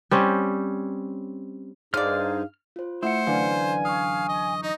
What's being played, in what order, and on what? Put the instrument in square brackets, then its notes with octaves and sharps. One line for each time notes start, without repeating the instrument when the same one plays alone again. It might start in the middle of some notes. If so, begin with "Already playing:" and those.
[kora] G3 C4 C#4
[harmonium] G2 D#4 [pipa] D3 D5 [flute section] G#4 C5 F5 [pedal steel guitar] F6
[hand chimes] F4 C5
[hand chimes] A3 F#5 C#7 [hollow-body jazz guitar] E4 [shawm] C5
[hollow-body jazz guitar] F#2 D3 E3 [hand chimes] B4 D5 F5 [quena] G#5
[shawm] F5 [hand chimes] C#6 D#6
[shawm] D#5
[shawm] D#4 [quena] D#5